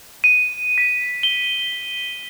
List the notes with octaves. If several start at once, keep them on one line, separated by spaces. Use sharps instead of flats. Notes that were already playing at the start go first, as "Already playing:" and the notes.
D#7
B6
G7